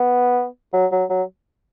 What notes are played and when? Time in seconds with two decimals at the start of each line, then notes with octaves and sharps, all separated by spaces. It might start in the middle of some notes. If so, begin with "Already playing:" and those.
Already playing: B3
0.74 F#3
0.92 F#3
1.10 F#3